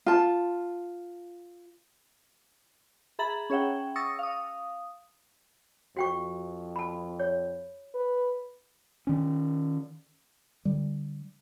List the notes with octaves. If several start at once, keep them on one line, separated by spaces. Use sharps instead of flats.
F4 A5
G#4 E5 A#5 B5 A6 F#7
C#4 G#4 C#5 E5 F#5 G5
C#6 D#6 E6 A6 A#6 C#7
F5 D#6
F2 F#4 G5 C#6
A5 B5
C#5
B4
D#3 C#4
D3 G3